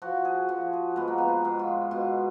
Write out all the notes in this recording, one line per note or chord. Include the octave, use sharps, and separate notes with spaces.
F3 F#4
G#4
F3 F#4
G#4
G#2 B3
A#3
B3
G#4
G#2
F4
B2 F4